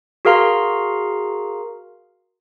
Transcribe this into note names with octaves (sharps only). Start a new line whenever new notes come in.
F#4 G#4 A#4 F5 A#5 C6